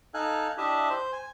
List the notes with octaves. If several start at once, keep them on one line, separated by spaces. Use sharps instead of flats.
D#4 A4 F5 G#5 F#6
D4 E4 G4 D#5 E5
C5
G#5